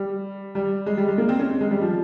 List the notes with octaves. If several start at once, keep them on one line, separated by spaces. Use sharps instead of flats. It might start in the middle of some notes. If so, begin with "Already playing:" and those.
Already playing: G3
G3
G#3
G3
G#3
A#3
C4
C#4
C4
G#3
G3
F3